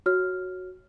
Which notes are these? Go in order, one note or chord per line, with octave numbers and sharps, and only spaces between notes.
F#4 C#5 F6